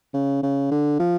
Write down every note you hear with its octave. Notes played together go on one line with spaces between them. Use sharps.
C#3
C#3
D3
F3